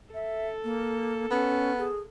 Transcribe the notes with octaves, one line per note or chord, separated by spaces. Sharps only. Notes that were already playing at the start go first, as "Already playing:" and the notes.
A4 E5
A#3
B3 C#4
G#4